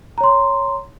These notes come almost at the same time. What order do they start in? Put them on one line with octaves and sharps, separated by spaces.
A#5 C#5 C6